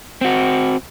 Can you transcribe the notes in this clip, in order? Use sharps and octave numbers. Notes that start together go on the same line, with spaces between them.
C4 F#4